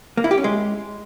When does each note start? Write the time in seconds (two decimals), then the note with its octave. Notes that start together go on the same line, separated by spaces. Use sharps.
0.17 A#3
0.24 E4
0.31 G4
0.38 C#4
0.44 G#3